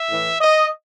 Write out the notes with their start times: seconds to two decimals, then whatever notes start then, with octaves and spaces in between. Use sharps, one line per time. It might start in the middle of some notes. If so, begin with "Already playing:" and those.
Already playing: E5
0.10 A2 E3
0.41 D#5